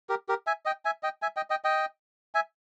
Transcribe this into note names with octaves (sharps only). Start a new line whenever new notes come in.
G4 A#4
G4 A#4
E5 G#5
D#5 G5
E5 G#5
D#5 G5
E5 G#5
D#5 G5
D#5 G5
D#5 G5
E5 G#5